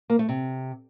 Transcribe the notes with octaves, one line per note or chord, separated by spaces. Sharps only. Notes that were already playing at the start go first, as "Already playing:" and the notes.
A#3
A3
C3